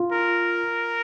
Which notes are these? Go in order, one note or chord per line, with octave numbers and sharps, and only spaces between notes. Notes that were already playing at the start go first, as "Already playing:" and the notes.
Already playing: F4
A#4